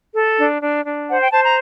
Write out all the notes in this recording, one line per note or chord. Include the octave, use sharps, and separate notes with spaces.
A4
D4
D4
D4
C5 F#5
G5
C5 A5
A#5